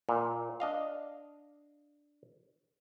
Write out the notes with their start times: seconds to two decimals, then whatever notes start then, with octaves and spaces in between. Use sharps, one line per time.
0.09 A#2
0.60 D4 D#5 F5